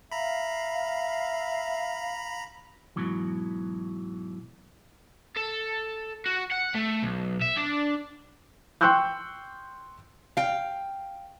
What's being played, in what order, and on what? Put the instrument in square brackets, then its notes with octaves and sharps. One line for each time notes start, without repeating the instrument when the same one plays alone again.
[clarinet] E5 [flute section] F5 [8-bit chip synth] A#5 B5
[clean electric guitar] G#2 B2 E3 F#3
[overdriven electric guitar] A4
F#4
F#5
A3
B1
E5
D4
[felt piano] G5 C6 C#6 E6 F#6 G6
[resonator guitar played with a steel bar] F5 G5